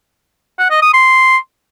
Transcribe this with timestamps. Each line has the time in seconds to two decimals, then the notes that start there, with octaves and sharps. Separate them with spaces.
0.59 F#5
0.70 D#5
0.82 D#6
0.93 C6